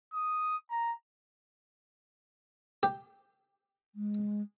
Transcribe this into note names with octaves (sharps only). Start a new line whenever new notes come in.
D#6
A#5
G4
G#3